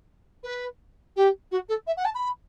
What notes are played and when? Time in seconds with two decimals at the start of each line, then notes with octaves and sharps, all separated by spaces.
0.44 B4
1.16 G4
1.51 F#4
1.69 A4
1.87 E5
1.97 F#5
2.05 A5
2.15 B5